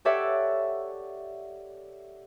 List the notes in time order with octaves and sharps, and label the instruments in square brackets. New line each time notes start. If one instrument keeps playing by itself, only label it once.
[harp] G4 A4 C#5 D5 E5 F#5